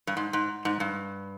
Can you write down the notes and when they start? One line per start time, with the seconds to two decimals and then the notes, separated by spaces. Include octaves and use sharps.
0.07 G2
0.17 G#2
0.33 G#2
0.65 G#2
0.80 G2